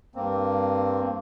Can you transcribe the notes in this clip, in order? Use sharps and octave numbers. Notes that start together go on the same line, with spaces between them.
G2 A#3 C4